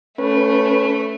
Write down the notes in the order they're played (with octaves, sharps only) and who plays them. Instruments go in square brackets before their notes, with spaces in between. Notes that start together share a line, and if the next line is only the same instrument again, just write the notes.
[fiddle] A3 [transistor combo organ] C#4 B4